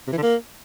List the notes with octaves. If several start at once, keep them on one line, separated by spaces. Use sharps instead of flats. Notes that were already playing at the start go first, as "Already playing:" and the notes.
C3
E3
D3
A#3